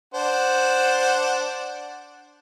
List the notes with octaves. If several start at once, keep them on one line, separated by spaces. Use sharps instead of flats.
D4 C5 F#5